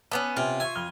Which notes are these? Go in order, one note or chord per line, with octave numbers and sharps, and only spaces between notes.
A3 B3 C#4 A5 D6 D#6
C3 B3 C#4 F4 G#5
E5 G#5 C#6
F2 F6 G7